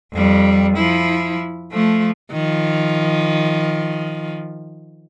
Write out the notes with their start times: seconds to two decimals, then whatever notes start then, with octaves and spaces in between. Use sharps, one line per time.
0.14 F2 G3
0.77 F3 E4
1.72 F3 A3
2.32 D#3 F3